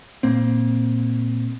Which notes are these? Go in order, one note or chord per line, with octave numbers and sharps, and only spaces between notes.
A#2 A#3 C4